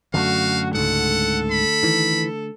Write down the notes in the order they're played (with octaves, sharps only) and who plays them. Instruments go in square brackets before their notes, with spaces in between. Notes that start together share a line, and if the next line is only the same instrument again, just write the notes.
[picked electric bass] F#2 [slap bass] D3 A3 [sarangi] F#4 [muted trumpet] F5
[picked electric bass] C#2 G#2 [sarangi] A4 [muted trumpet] F#5
[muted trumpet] B5
[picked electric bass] D#3 E3